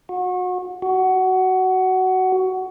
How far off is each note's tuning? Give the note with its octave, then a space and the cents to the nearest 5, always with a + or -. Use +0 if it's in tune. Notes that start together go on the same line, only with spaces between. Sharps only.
F#4 -30
F#4 +15